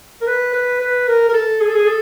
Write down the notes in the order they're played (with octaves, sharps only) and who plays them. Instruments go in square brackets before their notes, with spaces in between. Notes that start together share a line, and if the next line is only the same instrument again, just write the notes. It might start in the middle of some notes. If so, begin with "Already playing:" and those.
[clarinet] A#4
B4
B4
B4
A#4
A#4
A4
G#4
A4
G#4
A4